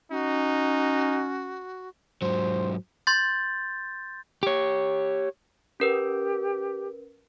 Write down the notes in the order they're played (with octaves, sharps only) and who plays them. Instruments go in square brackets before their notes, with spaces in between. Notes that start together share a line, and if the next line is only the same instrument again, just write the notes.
[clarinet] C#4 [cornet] D#4 [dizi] F#4
[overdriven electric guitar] G#2 F#3 [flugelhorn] C5
[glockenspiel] C6 G6 A6
[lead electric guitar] G4 C#5
[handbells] C#4 A#4 B4 [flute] G4